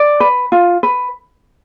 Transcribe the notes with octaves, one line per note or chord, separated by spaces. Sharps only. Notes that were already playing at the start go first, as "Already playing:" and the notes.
Already playing: D5
B4
F4
B4